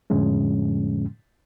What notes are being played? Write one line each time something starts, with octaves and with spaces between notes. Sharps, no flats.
F2 A2 D3 F3 G#3 C#4